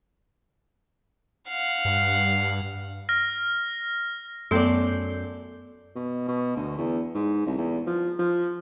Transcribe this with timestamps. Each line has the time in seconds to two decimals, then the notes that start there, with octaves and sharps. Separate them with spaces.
1.48 F5 F#5
1.85 G2
3.09 F6 A#6
4.51 F#2 A3 B3 A4 D5 C6 G6
5.95 B2
6.28 B2
6.56 D2
6.78 E2
7.14 G#2
7.46 C2
7.58 E2
7.87 F3
8.19 F3